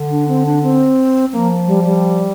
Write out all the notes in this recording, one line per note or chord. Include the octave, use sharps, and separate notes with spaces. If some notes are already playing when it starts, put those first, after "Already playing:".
Already playing: D3
D4
C4
D4
C4
F3 A#3
G3
G3